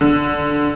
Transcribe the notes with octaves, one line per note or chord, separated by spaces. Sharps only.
D3